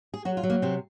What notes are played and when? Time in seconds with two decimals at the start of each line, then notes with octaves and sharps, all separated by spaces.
0.14 G#4
0.25 F#3 F#4
0.37 F4
0.43 F#3
0.50 A#3
0.62 C3 C4